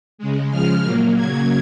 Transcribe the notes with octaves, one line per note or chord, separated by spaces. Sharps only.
C#3 G#3
C#3 F3 G#3 F6
A#2 F#3 A#3
C#3 F#3 A#3 G#6